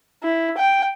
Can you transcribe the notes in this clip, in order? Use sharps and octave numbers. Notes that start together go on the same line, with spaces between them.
E4
G5